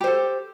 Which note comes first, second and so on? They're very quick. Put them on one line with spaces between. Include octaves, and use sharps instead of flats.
G4 C5 A4